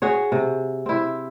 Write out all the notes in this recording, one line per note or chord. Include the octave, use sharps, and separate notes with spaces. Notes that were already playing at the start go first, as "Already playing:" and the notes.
F#4 G#4 C#5
C3
C4 E4